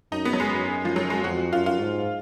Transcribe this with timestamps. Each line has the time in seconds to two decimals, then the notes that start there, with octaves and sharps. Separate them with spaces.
0.12 F#2 D#4
0.25 B3
0.33 F#3
0.40 F#2 G#3
0.85 F3
0.96 F#3
1.10 G#3
1.24 F2 F#4
1.52 F#2 F4
1.66 F4
1.80 G#2